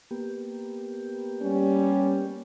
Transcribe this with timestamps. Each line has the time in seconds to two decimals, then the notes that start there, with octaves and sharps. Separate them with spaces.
0.11 A#3 B3 G4
1.42 G3 C#4